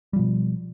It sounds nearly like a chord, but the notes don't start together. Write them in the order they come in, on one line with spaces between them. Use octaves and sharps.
G3 F3 B2